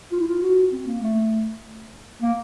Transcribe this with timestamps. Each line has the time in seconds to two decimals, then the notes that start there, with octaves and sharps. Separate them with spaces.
0.12 F4
0.20 E4
0.27 F4
0.42 F#4
0.72 C4
0.87 A#3
1.02 A3
2.22 A#3